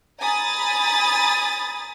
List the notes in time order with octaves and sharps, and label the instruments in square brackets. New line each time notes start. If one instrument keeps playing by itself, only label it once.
[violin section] G#5 A#5 B5 D#6 A6